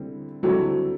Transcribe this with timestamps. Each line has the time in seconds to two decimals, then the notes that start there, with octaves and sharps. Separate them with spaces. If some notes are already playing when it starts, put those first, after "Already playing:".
Already playing: D3 G3 C4 E4
0.43 D3 F#3 G3 C4 E4 A4